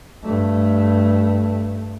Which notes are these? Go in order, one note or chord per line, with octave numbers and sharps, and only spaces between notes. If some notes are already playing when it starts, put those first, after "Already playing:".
G2 A3